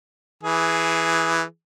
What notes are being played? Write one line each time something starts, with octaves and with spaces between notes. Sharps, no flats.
E3 G#4